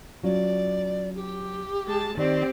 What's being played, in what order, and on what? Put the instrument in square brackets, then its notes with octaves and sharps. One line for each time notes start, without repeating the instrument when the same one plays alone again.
[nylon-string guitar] F#3 C#4 F4 [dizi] D5
[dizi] G4
[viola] G#3 A5
[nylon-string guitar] D#3 [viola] C4 G4 [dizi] D5